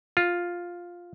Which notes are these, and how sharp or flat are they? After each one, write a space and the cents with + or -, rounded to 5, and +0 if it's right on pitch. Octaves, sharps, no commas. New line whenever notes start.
F4 +5